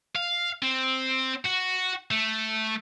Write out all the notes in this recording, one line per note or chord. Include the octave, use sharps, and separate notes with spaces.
F5
C4
F#4
A3